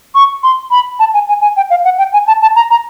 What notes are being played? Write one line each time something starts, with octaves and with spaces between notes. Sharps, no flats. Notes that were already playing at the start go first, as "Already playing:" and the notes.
C#6
C6
B5
A5
G#5
G#5
G#5
G5
F5
F#5
G5
G#5
A5
A5
A#5
A#5